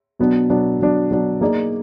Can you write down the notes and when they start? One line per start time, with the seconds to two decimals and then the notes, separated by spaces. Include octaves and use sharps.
0.19 B2 F#3 B3 D4
0.50 B2 F#3 B3 D4
0.80 B2 F#3 B3 D4
1.10 B2 F#3 B3 D4
1.41 A#3 D#4 G#4 D5